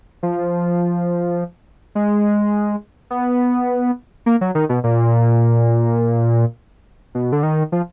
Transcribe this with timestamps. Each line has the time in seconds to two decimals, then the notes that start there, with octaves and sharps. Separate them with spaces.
0.23 F3
1.95 G#3
3.10 B3
4.26 A#3
4.41 F#3
4.55 D#3
4.69 B2
4.84 A#2
7.15 B2
7.32 D3
7.43 D#3
7.72 F3